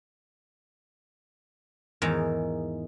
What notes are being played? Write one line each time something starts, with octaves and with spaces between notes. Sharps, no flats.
E2 G#2 D#3 A#5